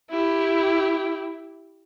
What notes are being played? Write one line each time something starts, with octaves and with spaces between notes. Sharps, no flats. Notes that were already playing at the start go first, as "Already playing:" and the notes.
E4 G4